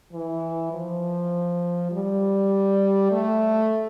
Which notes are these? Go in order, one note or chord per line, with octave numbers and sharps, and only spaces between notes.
E3
F3
G3
A3